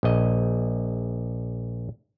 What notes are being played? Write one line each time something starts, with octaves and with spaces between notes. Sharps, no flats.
A#1 D#5